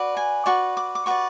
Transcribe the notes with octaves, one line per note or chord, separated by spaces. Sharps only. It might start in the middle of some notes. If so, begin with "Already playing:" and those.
Already playing: F#4 B4 D5
G#5
F#4 B4 D5 C#6
D6
D6
F#4 B4 D5 C#6